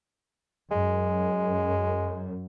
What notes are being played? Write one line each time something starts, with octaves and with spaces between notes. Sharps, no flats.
F#2 G#3